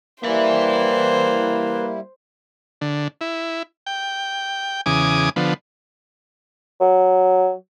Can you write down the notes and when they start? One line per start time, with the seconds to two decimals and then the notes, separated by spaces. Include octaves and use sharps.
0.24 G3 A#3 E4 B4 C5 E5
2.81 D3
3.21 E4
3.87 G5
4.86 E2 C#3 G#5 D6 D#6
5.36 D3 F3 B3
6.81 F#3